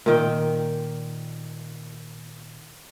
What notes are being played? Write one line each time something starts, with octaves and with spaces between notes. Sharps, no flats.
A#2 D#3 G5